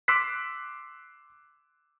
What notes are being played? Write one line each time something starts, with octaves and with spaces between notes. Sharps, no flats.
C6 D6 E6 F#6 B6 C7